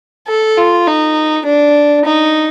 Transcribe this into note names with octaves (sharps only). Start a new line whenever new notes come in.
A4
F4
D#4
D4
D#4